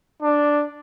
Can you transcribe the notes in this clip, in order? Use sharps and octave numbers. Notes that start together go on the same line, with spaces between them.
D4